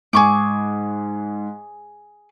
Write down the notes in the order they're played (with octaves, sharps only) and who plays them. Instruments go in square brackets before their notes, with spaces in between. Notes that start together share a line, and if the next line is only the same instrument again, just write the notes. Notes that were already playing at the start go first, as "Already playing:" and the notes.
[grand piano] G#2 [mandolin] G#4 C#6 D6